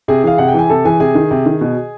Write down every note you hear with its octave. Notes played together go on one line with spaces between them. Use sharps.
C3 G#4 G#5
E3 F5
C3 F#5
G5
E3 G#5
C3 A4 A5
E3 G#4 G#5
C3 G#4 G#5
D#3
C3
D#3
B2